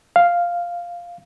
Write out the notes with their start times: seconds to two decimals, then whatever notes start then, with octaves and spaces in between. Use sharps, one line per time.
0.16 F5